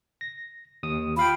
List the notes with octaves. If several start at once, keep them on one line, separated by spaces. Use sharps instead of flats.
A#6
D#2 D#6
F4 F5 G5 B5